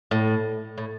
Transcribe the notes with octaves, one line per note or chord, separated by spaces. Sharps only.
A2
A2